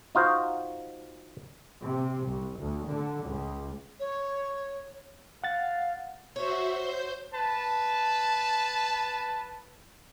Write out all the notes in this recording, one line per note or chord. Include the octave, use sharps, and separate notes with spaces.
D#4 F4 F#4 C5
C3
C2
D2
D3
C#2
C#5
F5 F#5 A6
F#4 C5 C#5 E5
C5 G6
B4 A5